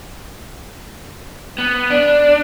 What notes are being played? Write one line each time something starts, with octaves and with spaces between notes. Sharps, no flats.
B3
D4